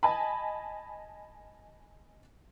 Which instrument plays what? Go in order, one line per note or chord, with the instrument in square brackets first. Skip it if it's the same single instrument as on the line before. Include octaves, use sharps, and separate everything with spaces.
[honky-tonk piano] D#5 G#5 A5 B5